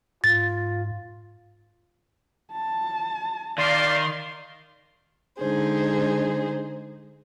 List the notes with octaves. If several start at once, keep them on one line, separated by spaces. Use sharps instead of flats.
G#2 F4 A6
A5
D#3 D5 F5 C6
D3 G#3 D#4 G#4 C5